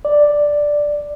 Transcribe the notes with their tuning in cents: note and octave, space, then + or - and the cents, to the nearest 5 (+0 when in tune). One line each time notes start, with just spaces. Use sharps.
D5 +0